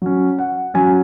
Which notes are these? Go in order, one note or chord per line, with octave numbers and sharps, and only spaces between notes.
F#3 C#4
F#5
F#3 C#4 G#5